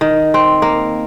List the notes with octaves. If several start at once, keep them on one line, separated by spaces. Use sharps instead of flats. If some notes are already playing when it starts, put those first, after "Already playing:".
D#3
C4
A#3